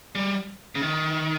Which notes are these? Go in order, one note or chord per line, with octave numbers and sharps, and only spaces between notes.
G3
C#3
D#3